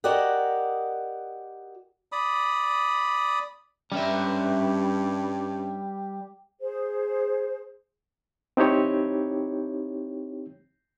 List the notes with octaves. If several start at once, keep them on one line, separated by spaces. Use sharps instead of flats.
F#4 G4 A#4 D5 D#5 F#5
D5 B5 D#6
G2 G3 C#4 G4 B4 E5
G#4 C5
C4 D#4 E4 G4 C#5